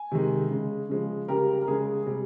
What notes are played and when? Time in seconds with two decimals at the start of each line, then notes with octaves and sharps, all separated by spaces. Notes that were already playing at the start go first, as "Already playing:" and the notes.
Already playing: G#5
0.12 C3 D#3 G#3
0.51 C#3 G#3
0.90 C#3 F3 G#3
1.28 C#3 G3 G4 A#4
1.62 A#4
1.67 C#3 G#3 G#4
2.07 C3 G3